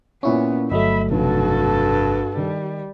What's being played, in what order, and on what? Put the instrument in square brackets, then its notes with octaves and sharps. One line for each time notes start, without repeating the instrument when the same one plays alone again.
[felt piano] A#2 C#6 [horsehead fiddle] B3 [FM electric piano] C#4 E4
[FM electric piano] G1 F#3 A3 [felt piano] D#5 [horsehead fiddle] E5 B5
[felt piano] F1 B1 [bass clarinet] G2 [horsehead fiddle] F#4 A4
[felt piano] D#3 [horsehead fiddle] G3